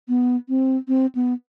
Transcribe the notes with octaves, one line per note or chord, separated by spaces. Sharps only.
B3
C4
C4
B3